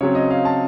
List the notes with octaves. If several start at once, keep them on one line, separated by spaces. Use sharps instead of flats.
C#3 F#3 C4 C#5
D#5
F5
A5